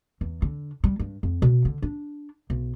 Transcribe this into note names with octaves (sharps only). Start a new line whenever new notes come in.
E2
D3
G3
G2
F2
B2
D3
D4
B1